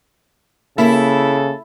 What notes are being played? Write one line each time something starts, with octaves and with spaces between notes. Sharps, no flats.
C#3 A#3 E4 A4